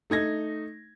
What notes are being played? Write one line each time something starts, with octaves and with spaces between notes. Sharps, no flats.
A3 D#4 G#6 A#6